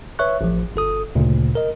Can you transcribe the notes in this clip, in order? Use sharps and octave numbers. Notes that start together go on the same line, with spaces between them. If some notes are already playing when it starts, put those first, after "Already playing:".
B4 C#5 E5 C#6 F#6
A1 F3
G1 A4 D#6
D2 A#2 C#3
A#4 D#5